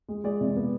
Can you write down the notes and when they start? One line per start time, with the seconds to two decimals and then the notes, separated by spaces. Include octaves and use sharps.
0.09 G#3
0.24 G#3 D5
0.41 C3
0.56 B3